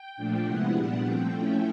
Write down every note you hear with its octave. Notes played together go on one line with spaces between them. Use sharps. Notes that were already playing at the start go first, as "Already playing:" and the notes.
Already playing: G5
A#2 F3 A3 D4
C3 F3 G#3 B3 E4 F#5
A#2 G3 B3 D4
F3 A3 C4 G5
F3 A3 C#4 E4